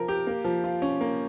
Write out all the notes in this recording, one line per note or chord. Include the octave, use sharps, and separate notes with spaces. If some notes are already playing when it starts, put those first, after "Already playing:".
Already playing: F3 A#4
G4
A#3
F3
F4
C#4
A#3